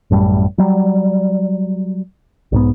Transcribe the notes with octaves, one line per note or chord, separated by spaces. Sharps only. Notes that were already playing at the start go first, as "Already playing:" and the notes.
A1 F#2 A2 G3
F#3 G3
B1 G#2 B3